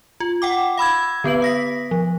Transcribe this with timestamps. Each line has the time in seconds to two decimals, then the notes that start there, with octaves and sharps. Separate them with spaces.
0.20 F4
0.42 F#5 G5 D6
0.78 F5 B5 E6 G#6
1.24 D3 B3 B4 F#7
1.42 D#6 A#6 B6
1.91 F3